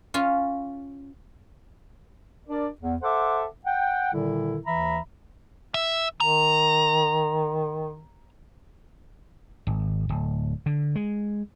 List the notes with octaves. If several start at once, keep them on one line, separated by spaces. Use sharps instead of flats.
C#4 F4
D4 A#4 D5
E2
A4 C5 E5 F#5 D6
F#5 G5
A#2 D3 D#3 G3 E4
D#2 E3 E5 A#5 B5
E5
D#3 A#5
G#1
D1
D3
G#3